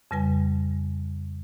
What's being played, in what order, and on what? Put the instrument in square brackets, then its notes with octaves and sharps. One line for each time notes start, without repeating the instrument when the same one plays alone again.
[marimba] F2 C#3 G3 B4 G#5